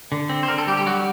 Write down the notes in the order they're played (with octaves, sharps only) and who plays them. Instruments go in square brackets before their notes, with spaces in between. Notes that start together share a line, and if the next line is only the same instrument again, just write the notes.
[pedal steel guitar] D3
C4
C5
D3 A#4
A4
G3 G4
G4
F#3 F#4